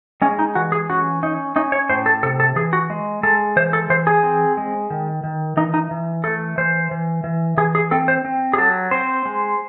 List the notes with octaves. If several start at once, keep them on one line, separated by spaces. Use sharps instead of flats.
G#3 C#4
D#4
E3 F#4
G#4
C#4 F#4
C#4 D#4
C#4 D#4
C#5
A2 C5
A4
C3 A4
A4
E3 G#4
F#4
G#3
G#3 A4
E3 C5
A4
E3 C5
G#4
C4
G#3
D#3
D#3
E3 D#4
D#4
E3
A3 A4
E3 C5
E3
E3
E3 G#4
G#4
C4 A4
C5
C4
G#4
F#3 A4
C4 C5
G#3